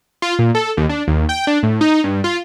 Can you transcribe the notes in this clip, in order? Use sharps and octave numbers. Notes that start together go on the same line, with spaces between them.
F4
A#2
A4
D#2
D4
D#2
G5
D4
A2
D#4
G2
F4